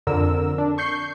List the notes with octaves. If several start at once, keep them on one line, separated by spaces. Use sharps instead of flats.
F2 D3 A#4 E6
D4
C#6 G6 C7